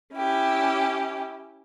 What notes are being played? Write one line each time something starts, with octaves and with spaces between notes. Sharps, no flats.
C#4 E4 G4